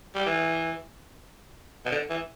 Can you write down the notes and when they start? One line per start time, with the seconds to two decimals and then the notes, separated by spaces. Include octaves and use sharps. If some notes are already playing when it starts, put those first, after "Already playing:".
0.15 G3
0.26 E3
1.85 B2
1.92 D3
2.10 E3